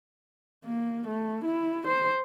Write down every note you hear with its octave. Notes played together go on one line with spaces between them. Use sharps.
A#3
A3
E4
C5